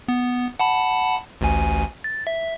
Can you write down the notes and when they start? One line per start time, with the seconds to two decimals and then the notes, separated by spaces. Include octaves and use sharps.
0.08 B3
0.59 F#5 A5 B5
1.41 A1 D2 G#5
2.04 A6
2.27 E5